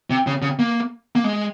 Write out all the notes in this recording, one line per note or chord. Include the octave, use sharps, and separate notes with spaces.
C3
C#3
C#3
A#3
A#3
G#3